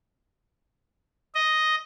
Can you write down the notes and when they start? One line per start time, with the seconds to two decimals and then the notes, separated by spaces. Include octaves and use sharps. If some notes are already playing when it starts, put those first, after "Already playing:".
1.35 D#5